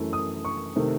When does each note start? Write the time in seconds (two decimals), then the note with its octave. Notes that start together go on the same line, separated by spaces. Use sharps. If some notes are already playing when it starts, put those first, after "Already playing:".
Already playing: F#2 E3 A3
0.13 D#6
0.45 C#6
0.76 C3 D#3 A3